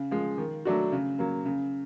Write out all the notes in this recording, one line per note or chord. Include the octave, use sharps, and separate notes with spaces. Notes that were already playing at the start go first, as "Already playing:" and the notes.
Already playing: C#3
F3 G#3
D#3
F#3 A3 D4 F#4
C#3
F#3 A#3
C#3